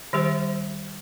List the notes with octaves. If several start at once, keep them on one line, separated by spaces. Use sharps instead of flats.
D#3 G3 G4 C5